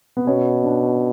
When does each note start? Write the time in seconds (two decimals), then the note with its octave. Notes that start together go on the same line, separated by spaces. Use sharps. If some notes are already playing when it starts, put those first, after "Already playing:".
0.17 B3
0.27 B2 C#4
0.64 D4